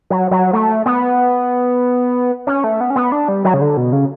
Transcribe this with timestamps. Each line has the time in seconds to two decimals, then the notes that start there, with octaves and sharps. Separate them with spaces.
0.10 F#3
0.31 F#3
0.53 A3
0.86 B3
2.47 C#4
2.64 A3
2.81 B3
2.90 C#4
2.96 B3
3.12 D4
3.28 G3
3.45 F#3
3.54 C#3
3.61 D3
3.77 B2
3.93 C#3